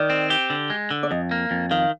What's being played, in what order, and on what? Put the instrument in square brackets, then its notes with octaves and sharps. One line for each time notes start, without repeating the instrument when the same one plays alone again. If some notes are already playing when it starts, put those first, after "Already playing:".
Already playing: [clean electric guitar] D#3 [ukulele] D5
[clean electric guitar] C4
G4
D3
G#3
D3
[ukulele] D5
[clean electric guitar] F2 [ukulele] D#5
[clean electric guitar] A#3
F2
[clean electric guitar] D#3 [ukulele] F5